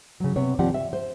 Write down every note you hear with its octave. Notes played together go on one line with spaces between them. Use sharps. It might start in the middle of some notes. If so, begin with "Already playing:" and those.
C#3 F#3
C3 B3 C4 C#5
D#2 F3 C4 G4 D5 F#5
E5
C5